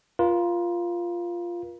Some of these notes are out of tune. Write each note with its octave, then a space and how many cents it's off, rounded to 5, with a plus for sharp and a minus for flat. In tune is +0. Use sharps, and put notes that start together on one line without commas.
F4 -5 A#4 +40